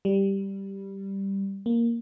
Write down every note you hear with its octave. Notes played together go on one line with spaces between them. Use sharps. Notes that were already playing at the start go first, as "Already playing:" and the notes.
G3
A#3